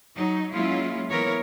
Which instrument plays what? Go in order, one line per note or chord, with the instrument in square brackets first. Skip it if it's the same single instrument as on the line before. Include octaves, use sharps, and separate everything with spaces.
[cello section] F#3 D#4
F#3 G#3 A#3 C#4 E4 F4
E3 A#3 B3 A#4 C#5